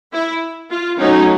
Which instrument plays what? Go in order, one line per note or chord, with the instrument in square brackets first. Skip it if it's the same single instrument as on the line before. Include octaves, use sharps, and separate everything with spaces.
[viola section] E4
F4
F#3 A3 C#4 D#4